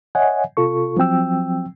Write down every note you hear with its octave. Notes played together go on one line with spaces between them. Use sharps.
C#5 D#5 E5 F#5 G#5
C3 F4 A4 C#6
F3 F#3 C4 G5 E6